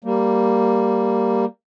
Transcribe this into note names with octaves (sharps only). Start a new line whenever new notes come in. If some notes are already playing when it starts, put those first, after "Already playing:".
G3 A#3